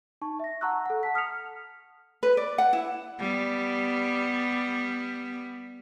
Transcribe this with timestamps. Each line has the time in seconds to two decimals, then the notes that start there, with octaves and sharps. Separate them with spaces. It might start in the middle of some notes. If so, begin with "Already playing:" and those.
0.21 D#4 A5 C#6
0.40 E5 A#6
0.61 F#5 A5 A#5 C#6 E6 F#6
0.86 A4 F#5
1.03 F#5 A5 B6
1.14 D#6 F6 B6 C#7 F7
2.23 B4
2.37 D5
2.58 F#5
2.73 E4
3.20 G3 B3